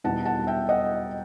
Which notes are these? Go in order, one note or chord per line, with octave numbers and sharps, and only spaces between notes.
E2 B2 G3 B3 D#4 F#5 A5
F#5 A5
E5 G5
D#5 F#5